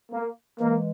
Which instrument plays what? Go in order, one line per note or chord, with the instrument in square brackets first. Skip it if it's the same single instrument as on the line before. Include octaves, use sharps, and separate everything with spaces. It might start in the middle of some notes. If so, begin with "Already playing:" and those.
[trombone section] A#3
[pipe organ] E3 G#3 [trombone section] A#3